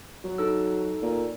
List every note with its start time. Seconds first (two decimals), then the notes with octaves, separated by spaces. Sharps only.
0.24 F#3
0.38 D#4 A4 E6
1.02 A#2